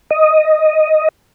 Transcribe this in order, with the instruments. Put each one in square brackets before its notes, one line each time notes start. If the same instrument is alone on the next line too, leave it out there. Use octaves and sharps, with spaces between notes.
[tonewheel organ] D#5